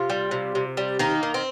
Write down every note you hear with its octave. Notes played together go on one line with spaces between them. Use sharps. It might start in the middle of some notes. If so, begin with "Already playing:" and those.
Already playing: C3 F4
G3
C3
C3
G3
D#3 A#3 D#4
D#3
C4